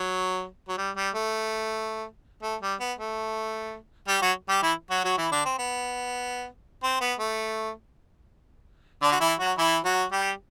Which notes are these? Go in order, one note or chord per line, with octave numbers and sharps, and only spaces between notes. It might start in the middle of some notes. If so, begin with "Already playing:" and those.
Already playing: F#3
F#3
G3
G3
A3
A3
G3
B3
A3
G3 G4
F#3 F#4
G3 G4
E3 E4
F#3 F#4
F#3 F#4
E3 E4
D3 D4
C4
B3
C4
B3
A3
D3 D4
F#4
E3 E4
F#3 F#4
E3 E4
F#3 F#4
G3 G4